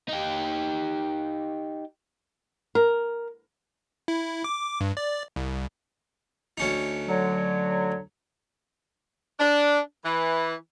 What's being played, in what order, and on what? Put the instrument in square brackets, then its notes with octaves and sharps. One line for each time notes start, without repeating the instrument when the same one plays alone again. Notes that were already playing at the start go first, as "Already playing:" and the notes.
[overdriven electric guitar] D#4 G4
[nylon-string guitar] A#4
[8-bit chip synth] E4
D6
G2
D5
C2
[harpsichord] D2 C#4 D#4
[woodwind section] D3 F#3
[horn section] D4
E3